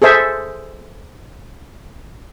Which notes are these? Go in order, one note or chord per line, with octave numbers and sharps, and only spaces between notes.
G#4 A4 C5 E5